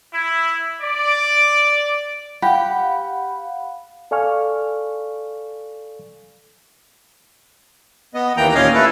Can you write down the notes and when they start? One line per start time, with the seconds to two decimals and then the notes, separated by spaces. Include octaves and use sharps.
0.13 E4
0.81 D5
2.42 G4 F5 F#5 B5
4.11 A4 D5 F5 G#5 C#6 F6
8.14 B3 D#5
8.37 D#2 E3 A#3 G5 A#5
8.55 D#2 A#2 C#4 D#5 F5 G#5
8.74 A3 E4 A4 B4